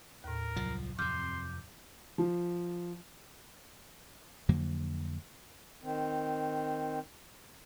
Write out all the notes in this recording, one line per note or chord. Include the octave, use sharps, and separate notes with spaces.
D#2 A2 A#4
C2 F3 F#3
F2 C3 C6 D6 F6 G6
F3
F2 D3 F#3 A#3
D#3 C4